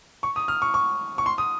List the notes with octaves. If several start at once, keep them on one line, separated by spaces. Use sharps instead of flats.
C#6
D#6
F6
C#6
C#6
C#6
C6
D#6